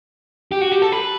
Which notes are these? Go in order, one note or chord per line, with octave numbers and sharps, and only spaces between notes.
G4
F#4
G4
A4
B4